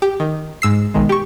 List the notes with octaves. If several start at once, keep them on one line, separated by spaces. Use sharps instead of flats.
G4
D#3
G#2 E6 C7
B1 D#3 G#3
G4 C#6